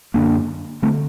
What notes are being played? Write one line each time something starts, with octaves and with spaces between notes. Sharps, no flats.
F#2 D3 A#3 D4
D3 A3 C4